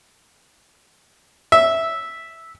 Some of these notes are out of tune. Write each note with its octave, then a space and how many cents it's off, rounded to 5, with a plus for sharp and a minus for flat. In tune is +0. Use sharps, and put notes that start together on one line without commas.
E5 -5